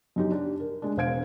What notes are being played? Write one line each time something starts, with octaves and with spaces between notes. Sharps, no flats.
F#2 D#4 G4
D4 G4
A#4
G#3 D4
E1 C5 F5 G#6 D7